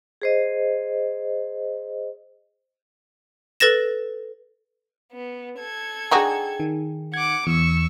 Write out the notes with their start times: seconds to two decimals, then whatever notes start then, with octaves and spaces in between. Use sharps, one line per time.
0.22 G#4 C5 D#5
3.60 A4 B4 A6 A#6 E7
5.13 B3
5.59 A4 G#6
6.11 D4 D#4 F#4 G#4 G5 G#5
6.60 D#3
7.14 F#5 D6 G#6
7.47 E2 C#6 E6